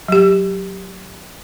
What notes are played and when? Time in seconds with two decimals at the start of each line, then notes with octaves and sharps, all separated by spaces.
0.08 F#3 G4